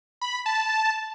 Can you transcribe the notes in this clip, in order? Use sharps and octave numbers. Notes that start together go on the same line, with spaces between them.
B5
A5